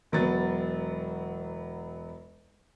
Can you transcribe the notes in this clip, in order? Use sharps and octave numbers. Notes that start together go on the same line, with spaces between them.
E1 F#3 B3 A6